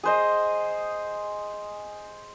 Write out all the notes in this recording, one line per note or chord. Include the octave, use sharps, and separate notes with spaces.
G#4 C5 D#5